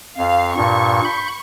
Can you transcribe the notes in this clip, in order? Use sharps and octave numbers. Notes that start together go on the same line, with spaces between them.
F2 F5
G2 A#2 C#6
B5 G6